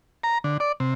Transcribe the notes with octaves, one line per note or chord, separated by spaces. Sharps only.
A#5
D3
D5
C3